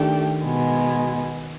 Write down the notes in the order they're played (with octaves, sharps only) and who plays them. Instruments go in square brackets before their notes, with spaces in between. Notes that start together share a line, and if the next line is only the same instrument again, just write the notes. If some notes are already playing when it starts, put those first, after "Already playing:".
Already playing: [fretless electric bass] D#3 [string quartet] A3 D4 G4
[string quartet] B2 G#3 B3